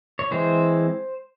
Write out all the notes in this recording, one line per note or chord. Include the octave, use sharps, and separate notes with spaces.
C#5
E3 G#3 C4 C5